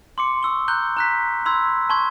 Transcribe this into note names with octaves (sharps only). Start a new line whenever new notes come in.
C6 D6 C#7
C#6 E6 G7
A#5 F#6 G6 G7
A#5 F#6 B6
B5 C6 E6 G#6
A5 C6 C#6 G#6